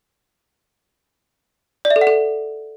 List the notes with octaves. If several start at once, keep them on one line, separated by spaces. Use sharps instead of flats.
D5
E5
A4
F#5
A4